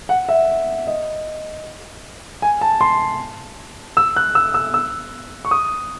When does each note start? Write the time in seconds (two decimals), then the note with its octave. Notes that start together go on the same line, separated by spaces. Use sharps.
0.09 F#5
0.29 E5
0.87 D#5
2.42 G#5
2.61 A5
2.81 C6
3.97 E6
4.17 F#6
4.35 E6
4.54 E6
4.74 E6
5.45 C#6
5.51 D#6